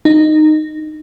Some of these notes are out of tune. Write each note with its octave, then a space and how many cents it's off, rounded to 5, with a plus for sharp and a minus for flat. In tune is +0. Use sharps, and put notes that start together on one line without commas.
D#4 -15